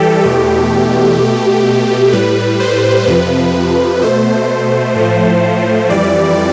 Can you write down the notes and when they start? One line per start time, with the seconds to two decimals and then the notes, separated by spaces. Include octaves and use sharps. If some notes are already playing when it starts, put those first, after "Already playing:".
Already playing: E3 G3 G4 A4
0.24 E2 B2 A3 G4
1.18 B2 A3
2.12 A2 G3 B4
2.60 C5
3.07 F2 C3 F3 B4
4.02 B2 A3 C5
4.96 A2 F3 A3
5.90 F2 E3 G3 D5